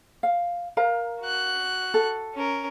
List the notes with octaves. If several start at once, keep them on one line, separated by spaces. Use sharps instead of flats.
F5
A#4 F5 A#5
F#4 F#6
A4
C#4 A#4